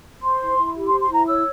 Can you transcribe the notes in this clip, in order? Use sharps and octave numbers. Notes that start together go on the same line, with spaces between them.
C5 C6
E4
E4
G4
C6
C5
C6
E4 A#5
C#5 E6